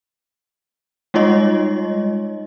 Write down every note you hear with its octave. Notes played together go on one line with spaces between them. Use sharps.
G3 G#3 D#4 F4 C#5 D#5